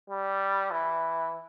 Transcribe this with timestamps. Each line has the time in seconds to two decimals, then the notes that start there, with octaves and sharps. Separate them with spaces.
0.10 G3
0.71 E3